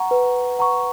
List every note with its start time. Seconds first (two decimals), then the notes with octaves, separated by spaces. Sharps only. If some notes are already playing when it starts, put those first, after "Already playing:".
Already playing: F#5 A#5 C#6
0.11 B4
0.59 F#5 A#5 C#6